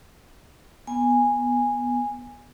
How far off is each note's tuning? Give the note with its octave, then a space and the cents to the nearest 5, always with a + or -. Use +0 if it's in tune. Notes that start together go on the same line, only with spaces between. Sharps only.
B3 -5 G#5 -10